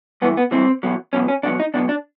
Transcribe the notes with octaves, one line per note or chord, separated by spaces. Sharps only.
G2 E3 B3
B3
G2 E3 C4
E2 B2 F#3
E2 B2 F#3 C#4
C#4
E2 B2 F#3 D4
D#4
E2 B2 F#3 D4
D4